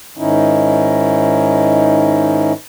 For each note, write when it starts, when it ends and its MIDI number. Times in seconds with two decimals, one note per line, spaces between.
0.17 2.53 44
0.17 2.53 51
0.17 2.53 61
0.17 2.53 63
0.17 2.53 64